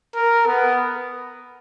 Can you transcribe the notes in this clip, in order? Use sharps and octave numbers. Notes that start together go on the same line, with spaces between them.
A#4
B3